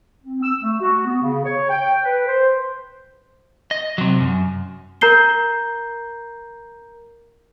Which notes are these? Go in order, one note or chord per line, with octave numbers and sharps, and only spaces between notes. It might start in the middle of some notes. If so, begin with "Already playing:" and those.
C4
E6
A3
F#4
B3
C#3
C#5
G5
B4
C5
D#5
C3 F#3
F#2
A#4 A#5 G6 C7 G7